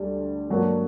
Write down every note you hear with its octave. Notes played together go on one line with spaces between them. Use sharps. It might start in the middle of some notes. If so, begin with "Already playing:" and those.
Already playing: D2 D3 G3
G2 F#3 A#3 D4